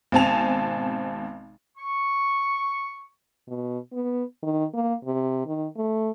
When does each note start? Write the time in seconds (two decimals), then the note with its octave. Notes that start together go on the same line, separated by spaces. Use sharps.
0.12 G#1 B2 C4 G#5 A5 F7
1.77 C#6
3.48 B2
3.92 B3
4.43 D#3
4.74 A#3
5.05 C3
5.46 D#3
5.76 A3